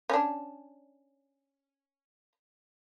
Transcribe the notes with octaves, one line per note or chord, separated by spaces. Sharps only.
C#4 D4